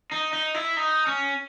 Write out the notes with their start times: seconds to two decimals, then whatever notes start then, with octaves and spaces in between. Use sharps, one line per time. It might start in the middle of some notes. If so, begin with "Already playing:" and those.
0.12 D#4
0.33 D#4
0.54 E4
0.76 D#4
1.07 C#4